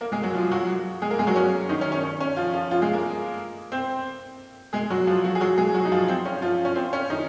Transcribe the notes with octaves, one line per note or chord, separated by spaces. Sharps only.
A#3 A#4
G#3 G#4
F#3 F#4
F3 F4
F#3 F#4
G#3 G#4
A#3 A#4
G#3 G#4
F#3 F#4
C#4
D#3 D#4
C#4
C#4
C#4
C#4
F3 F4
F3 F4
F3 F4
G#3 G#4
A#3 A#4
C4 C5
G#3 G#4
F#3 F#4
F3 F4
F#3 F#4
G#4
F#3 F#4
G#3 G#4
F#3 F#4
D#4
F3 F4
C4
C#4
F3 F4
C#4
C4
C#4
D#3 D#4